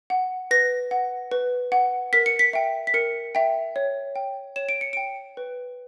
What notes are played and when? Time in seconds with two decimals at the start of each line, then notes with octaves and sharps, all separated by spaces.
0.10 F#5
0.51 B4 A#6
0.91 F#5
1.31 B4
1.72 F#5
2.13 A#4 B6
2.26 C#7
2.39 B6
2.53 E5 G5
2.87 B6
2.94 A#4 C#7
3.35 E5 G5
3.76 C#5
4.16 G5
4.56 C#5 E7
4.69 D7
4.81 C#7
4.93 G5 D7
5.37 B4